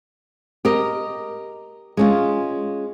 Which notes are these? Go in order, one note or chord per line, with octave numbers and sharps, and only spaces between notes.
G4 A#4 D#5
G#3 C#4 F4